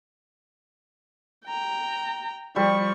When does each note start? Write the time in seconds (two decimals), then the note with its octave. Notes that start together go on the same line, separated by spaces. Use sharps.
1.47 G5 A#5
2.56 F3 G3 C#6